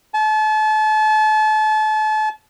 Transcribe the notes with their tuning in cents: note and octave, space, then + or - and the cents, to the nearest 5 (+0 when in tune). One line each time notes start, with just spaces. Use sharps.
A5 -35